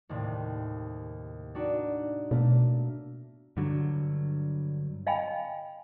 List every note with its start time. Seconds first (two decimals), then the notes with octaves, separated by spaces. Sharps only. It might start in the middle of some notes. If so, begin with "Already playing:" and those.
0.09 D#2 A2 C3
1.55 D4 D#4 F#4
2.31 B2 A3 A#3
3.57 G2 D3 F#3
5.07 D#5 F5 G5 G#5 B5